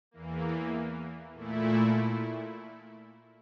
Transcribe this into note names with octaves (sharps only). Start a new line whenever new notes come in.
E2 E3 A#3
A#2 A3 E4